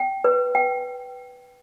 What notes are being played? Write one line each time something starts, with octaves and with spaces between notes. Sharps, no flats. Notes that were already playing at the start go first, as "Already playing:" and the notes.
Already playing: G5
B4
G5